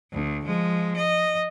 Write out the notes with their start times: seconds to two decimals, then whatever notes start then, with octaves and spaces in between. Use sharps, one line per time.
0.13 D2
0.45 F3 G#3
0.96 D#5